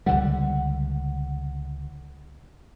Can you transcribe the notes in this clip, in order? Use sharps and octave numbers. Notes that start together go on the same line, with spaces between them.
C#2 D3 G3 F#5